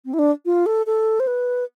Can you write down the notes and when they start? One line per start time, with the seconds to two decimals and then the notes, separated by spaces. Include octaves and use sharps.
0.06 C4
0.14 E4
0.19 D4
0.46 F4
0.66 A4
0.86 A4
1.20 C5
1.27 B4